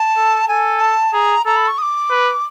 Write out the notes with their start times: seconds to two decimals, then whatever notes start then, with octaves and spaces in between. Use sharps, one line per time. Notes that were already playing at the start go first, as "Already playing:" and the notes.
Already playing: A5
0.17 A4
0.48 A4 G#5
0.81 A5
1.13 G#4 A#5
1.46 A4 A#5
1.56 B5
1.68 C#6
1.78 D#6
1.82 D6
2.10 B4